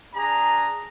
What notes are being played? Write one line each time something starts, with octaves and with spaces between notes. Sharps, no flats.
D4 G#4 A#5